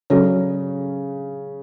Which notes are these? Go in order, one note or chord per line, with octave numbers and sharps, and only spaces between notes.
C#3 F#3 C#4 F#4 A4 C#5